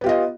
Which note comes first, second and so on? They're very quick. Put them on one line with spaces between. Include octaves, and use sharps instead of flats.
B3 G4 F4 D#5